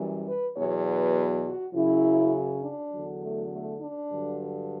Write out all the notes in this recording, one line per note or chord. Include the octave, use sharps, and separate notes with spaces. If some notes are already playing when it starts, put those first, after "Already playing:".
Already playing: F#2 E3 G3
B4
E2 B2 F#3 C#5
B4
F#4
F#2 C#3 F#3 E4
D4
E2 D3 F#3
A3
A3
D4
G2 D3 F#3